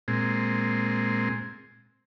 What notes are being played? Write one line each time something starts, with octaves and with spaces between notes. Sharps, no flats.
A#2 G#3 C4